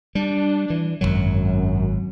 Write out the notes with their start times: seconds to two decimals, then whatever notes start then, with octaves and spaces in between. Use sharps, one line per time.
0.15 G3 D4
0.70 E3
1.01 G#1 C#2 F#2 F#3